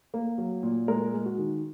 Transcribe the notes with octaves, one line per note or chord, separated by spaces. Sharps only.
A#3
F#3
A#2
G#3 A#4
G#3
F#4
D#3